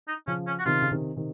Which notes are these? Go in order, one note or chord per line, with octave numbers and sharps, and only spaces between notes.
D#4
C#3 F3 C#4
C#4
F#4
C3 D#3 F4
C#3
C3 D#3
C3 D#3